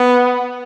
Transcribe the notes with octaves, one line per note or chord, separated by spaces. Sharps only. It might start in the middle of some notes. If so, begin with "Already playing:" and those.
Already playing: B3